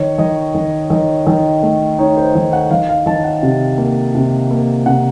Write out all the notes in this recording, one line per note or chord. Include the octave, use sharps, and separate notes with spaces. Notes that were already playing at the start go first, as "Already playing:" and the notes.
Already playing: D#3 C#5
D#3 D#5
D#3
D#3
D#3
A3
D#4 C#5
C5
D#3
F#5
D#3 F5
F5
D#3 A5
F#5
C3
A#3
C3
A#3
C3 F#5